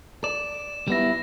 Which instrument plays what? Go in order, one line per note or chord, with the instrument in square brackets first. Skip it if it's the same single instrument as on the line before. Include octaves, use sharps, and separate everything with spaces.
[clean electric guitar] D5 [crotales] E7
[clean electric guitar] G3 B3 E4 [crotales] A#6 E7